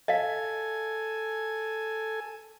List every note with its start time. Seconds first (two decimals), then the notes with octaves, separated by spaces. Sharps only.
0.08 A4 D#5 F5 G#5